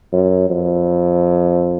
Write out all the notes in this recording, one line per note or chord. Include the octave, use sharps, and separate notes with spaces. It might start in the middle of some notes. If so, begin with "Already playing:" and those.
F#2
F2